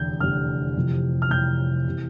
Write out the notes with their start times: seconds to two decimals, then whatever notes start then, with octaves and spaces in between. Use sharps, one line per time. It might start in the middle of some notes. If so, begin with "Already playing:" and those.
Already playing: F1 E2 D3 G6
0.20 F1 E2 D3 F6
0.76 F1 F2 C3 E3
1.22 F6
1.30 F1 F2 C3 E3 G6
1.88 C3 E3